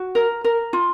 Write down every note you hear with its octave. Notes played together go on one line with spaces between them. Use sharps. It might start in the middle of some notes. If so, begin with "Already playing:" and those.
Already playing: F#4
A#4
A#4
F4